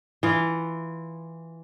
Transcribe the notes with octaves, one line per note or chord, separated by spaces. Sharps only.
E3 F4